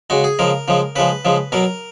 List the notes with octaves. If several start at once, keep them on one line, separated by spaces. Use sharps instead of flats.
C#3 G#3 F#4
G#4
C#3 F3 G#3 A#4
C#3 F3 G#3
C#3 F3 G#3 B4
C#3 F3 G#3
B2 F#3 A#4